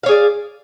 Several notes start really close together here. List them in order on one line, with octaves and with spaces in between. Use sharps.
F5 C#5 G#4 D5